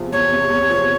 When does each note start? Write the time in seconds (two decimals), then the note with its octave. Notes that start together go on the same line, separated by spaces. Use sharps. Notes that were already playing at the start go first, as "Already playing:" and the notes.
Already playing: E2 C3 F3
0.12 E2 C#5
0.32 C3
0.50 E2
0.69 F3